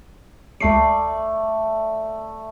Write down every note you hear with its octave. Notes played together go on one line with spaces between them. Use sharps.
C#2 A3 D5 C7